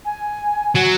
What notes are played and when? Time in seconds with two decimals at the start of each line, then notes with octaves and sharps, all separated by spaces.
0.05 G#5
0.75 F#3